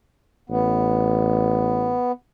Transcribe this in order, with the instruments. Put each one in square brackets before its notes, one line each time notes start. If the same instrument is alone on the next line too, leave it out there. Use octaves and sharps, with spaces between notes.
[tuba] A1 [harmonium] B3